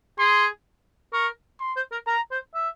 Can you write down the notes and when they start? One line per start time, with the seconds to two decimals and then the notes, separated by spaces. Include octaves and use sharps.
0.19 G#4 C6
1.13 A#4 C#6
1.60 C6
1.76 C5
1.92 A#4
2.07 A#4 A#5
2.31 C5
2.54 E5